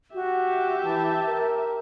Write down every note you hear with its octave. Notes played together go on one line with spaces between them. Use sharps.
F#4 G4 E5
E3 A5
A#4